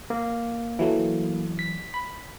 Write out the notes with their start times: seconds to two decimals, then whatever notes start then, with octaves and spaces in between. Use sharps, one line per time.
0.10 A#3
0.79 E3 F#3 A3
1.59 B6
1.94 B5